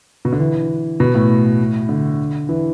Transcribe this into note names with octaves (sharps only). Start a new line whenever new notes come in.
B2
D3
E3
B2
A2
D3
E3